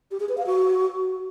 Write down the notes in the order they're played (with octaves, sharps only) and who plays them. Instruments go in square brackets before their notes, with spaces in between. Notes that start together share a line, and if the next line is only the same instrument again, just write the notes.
[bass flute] G4
G#4
B4
F5
F#4